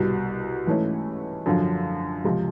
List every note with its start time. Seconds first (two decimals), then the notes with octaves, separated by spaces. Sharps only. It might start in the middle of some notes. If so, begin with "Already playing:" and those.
Already playing: C2 B2 G3
0.67 G#2 E3 A3 C#4 E4
1.46 F#2 D3 F3
2.24 C#2 C3 F3